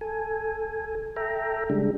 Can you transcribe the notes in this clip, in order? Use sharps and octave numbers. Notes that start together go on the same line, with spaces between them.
A4 G#5
A4 E5 G5 A#5
C#3 G3 G#3 D4